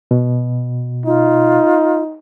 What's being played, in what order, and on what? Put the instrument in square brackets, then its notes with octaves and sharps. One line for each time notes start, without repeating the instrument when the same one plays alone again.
[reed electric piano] B2
[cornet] D#4 [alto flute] F4